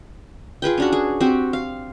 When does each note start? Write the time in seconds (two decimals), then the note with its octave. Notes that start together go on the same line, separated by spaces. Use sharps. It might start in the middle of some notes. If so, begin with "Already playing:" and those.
0.62 F4 G#4 B4 G5
0.78 C#4 D4 F#4
0.92 G#4
1.21 C4 F#4 G4
1.53 F5